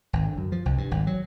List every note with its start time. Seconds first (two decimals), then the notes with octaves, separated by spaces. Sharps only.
0.13 G#1
0.26 D3
0.38 F#2
0.52 F3
0.66 C2
0.78 G2
0.91 G#1
1.07 F#3